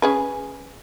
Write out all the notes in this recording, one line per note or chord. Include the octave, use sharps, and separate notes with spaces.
C#4 G#4 B4